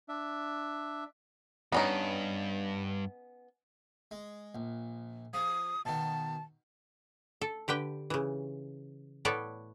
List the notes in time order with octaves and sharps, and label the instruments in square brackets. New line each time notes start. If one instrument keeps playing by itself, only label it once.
[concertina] D4 E5
[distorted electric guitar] E2 G2 [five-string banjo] B3 C#4 D#4
[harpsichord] G#3
A#1
[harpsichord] F3 [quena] D#6
[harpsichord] B2 D#3 [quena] A5
[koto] A4
D3 G4 B4 G5
C#3 E3
A2 B3 A4 C#5 D5